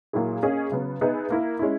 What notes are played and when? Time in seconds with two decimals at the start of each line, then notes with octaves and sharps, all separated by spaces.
0.13 A#2 F#3 A#3 E4 G#4
0.42 A#3 C#4 G#4 D#5
0.72 C#3 F#3 B3
1.01 B3 D#4 G#4 B4 E5
1.30 A#3 E4 A#4
1.59 G#3 C#4 E4